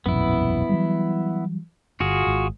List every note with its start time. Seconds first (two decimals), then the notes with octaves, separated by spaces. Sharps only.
0.06 E1 A#1 F#2 B3 E4
0.69 E3 F#3 G3
2.00 G1 F4 F#4 G#4
2.27 G#1